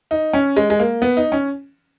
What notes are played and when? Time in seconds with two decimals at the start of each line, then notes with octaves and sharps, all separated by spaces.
0.11 D#4
0.34 C#4
0.57 G#3
0.70 G#3
0.79 A#3
1.02 B3
1.17 D#4
1.32 C#4